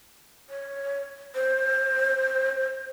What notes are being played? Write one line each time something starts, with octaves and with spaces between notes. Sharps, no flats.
C#5
C5